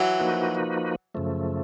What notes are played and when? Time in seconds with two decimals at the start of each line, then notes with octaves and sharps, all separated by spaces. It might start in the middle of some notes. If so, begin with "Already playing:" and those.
Already playing: E3 F#3
0.19 F3 A#3 D#4 F#4 B4
1.15 F#2 C#3 F3 A3